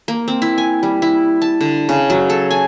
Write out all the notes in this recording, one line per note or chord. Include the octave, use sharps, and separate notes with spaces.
A#3
C4
E4
G#5
G3
E4
A5
D3
C#3
F#3
A4
G#5